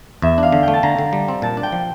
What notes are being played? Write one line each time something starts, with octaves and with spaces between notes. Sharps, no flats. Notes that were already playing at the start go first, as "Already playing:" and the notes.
E2 E5
D4 F5
D3
G5
A3
A5
D3 A#5
D3
G3
C4
A#2 A5
D4
G5
F3